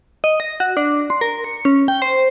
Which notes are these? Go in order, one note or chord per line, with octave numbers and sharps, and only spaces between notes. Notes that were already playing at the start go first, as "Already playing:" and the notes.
D#5
A#6
F#4
D4
C6
A#4
C#7
C#4
G5
C5